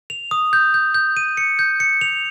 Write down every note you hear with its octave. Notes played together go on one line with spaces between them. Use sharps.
F7
D#6
G6
G6
G6
D#7
C#7
G6
C#7
F7